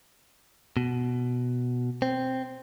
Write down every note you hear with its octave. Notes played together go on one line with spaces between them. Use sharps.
B2
C4